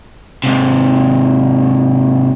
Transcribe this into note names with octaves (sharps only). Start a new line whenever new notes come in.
G#2 C3